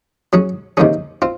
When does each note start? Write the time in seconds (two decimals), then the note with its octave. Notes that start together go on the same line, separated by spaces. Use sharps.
0.33 F#3 C#4 G#4
0.77 C3 D#3 A#3 C#4 G#4
1.22 C4 F4